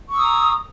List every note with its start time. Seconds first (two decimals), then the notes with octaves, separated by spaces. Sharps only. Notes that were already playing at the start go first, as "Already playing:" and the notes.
0.09 C#6
0.14 E6
0.18 D#6
0.23 A#5